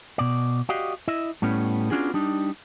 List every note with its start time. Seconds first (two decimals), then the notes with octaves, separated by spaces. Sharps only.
0.18 B2 D5
0.69 F#4 G4 D5 D#5 F5 F#5
1.08 E4 D#5 E5
1.42 A2 G3 B3 C#4
1.91 B3 C#4 D4 F4 F#4 G#4
2.14 G3 D4 D#4